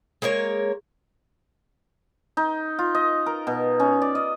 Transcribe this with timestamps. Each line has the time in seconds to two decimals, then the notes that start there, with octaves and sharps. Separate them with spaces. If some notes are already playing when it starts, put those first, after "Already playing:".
0.22 G#3 A#3 A#4 C#5
2.37 D#4
2.79 F4
2.95 D#5
3.26 A#4
3.47 B2
3.80 C#4
4.02 D5
4.15 D#5